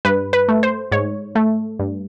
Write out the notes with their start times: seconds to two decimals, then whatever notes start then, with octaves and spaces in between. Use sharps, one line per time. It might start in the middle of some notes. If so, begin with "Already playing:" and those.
0.05 G2 B4
0.33 B4
0.48 A3
0.63 C5
0.92 G#2 C#5
1.35 A3
1.79 G2